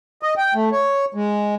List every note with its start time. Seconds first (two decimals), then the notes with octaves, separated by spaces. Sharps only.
0.23 D#5
0.37 G5
0.54 A3
0.72 C#5
1.14 G#3